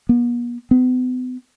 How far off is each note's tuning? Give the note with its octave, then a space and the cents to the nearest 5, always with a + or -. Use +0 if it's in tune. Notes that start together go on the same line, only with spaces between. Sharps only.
B3 -45
B3 +40